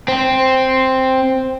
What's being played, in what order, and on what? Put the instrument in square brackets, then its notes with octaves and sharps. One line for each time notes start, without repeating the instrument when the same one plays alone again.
[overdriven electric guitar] C4